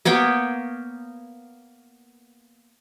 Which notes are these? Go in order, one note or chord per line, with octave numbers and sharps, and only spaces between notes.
A#3 B3 C#5 G5